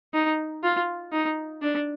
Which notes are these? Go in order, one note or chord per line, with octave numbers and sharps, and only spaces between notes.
D#4
F4
D#4
D4